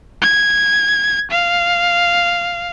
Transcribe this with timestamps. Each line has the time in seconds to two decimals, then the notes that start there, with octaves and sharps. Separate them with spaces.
0.22 G#6
1.31 F5